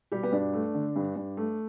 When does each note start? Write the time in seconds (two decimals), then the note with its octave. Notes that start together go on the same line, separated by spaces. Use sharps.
0.12 B2 G3 G4
0.23 B3
0.32 G2 D4
0.53 A3
0.74 D3
0.96 G2
1.16 G2
1.37 A3